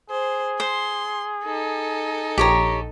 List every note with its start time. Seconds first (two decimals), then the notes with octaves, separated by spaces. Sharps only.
0.10 G#4 C5
0.60 C5 C6
1.45 D#4 A4
2.38 A#1 G4 C#5 A#5